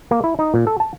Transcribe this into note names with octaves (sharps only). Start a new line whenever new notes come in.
A#3
E4
D#4
A#2
A4
A5